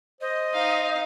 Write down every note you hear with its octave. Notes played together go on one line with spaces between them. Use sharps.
C5 D#5
D#4 F5